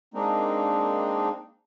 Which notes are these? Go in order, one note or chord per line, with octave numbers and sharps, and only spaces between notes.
G#3 A#3 C4 D4 D#4